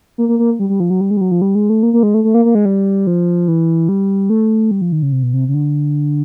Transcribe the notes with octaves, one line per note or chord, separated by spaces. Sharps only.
A#3
A#3
A#3
G3
G3
F3
F#3
G3
G#3
G3
F#3
F3
G3
G#3
A3
A#3
A#3
G#3
A3
A3
A#3
A#3
G#3
G3
F3
E3
G3
A3
G3
F3
D#3
C#3
C3
B2
C3
C#3
D3